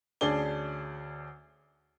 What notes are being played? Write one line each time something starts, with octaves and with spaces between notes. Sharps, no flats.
D2 C#4 D4 G#4 D5 G7